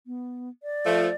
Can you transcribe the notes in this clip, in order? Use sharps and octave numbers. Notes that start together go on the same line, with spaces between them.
B3
D5
F3 A3